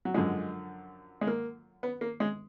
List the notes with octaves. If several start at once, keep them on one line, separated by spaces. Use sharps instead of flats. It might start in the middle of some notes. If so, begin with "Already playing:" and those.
F#3
F#2 D3 F3 G#3
G#3
A#3
B3
A#3
G#3